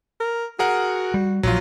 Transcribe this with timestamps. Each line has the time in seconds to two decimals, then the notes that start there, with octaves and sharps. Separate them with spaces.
0.21 A#4
0.59 F#4 G#4 A#4 F#5
1.14 G3
1.43 A#1 A#2 F3 F#3 F4